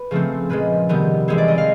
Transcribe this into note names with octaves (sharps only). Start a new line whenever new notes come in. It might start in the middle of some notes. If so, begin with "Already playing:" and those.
Already playing: B4
C#3 F3 A3 C4
A#2 F3 G#3 B4
C3 D#3 G3 B3
E3 G#3 C4 C#5
D5
D#5
F5